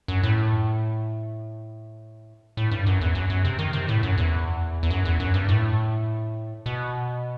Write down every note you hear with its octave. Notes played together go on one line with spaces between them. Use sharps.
F#2
A2
A2
G2
F#2
E2
F#2
F#2
C3
D#3
C3
A2
F#2
E2
E2
F#2
E2
F#2
G2
A2
B2